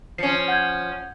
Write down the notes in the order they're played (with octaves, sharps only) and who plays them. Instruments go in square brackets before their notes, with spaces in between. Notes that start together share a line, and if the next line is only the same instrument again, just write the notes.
[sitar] F3 C#4 [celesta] C7 C#7
[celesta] F#5 G6 G#6